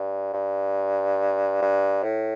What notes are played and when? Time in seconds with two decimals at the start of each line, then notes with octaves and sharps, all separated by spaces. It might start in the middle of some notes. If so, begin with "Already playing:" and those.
Already playing: G2
0.34 G2
1.62 G2
2.03 A2